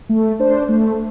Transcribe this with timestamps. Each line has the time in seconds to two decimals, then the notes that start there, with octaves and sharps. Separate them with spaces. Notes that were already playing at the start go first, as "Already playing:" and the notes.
0.09 A3
0.39 D4 C5
0.69 A3